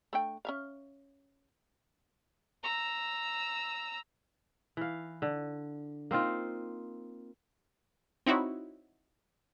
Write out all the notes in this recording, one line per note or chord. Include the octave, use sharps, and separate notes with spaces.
A3 D4 G5
C#4 E5 F5
A#5 E6
E3 F5
D3
A#3 C4 D#4 F4
C4 D#4 E4 F#4 C#5